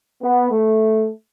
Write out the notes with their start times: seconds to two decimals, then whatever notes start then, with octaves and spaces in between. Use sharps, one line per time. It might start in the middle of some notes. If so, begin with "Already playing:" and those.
0.23 B3
0.51 A3